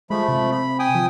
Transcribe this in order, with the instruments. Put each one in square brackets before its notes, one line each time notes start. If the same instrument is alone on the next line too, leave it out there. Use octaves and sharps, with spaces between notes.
[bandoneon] F3 A3 B5 [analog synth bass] G#3
[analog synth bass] C3
[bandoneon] B5
G5 G#5 D#6
[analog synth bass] F3